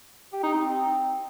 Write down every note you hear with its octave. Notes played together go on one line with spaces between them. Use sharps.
G4
D#4
C4